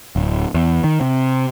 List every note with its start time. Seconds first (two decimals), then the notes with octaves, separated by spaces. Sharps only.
0.16 D1
0.54 E2
0.84 D#3
1.01 C3